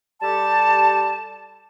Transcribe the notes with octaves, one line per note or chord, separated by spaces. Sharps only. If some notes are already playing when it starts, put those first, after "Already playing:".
G3 G4 A4 A5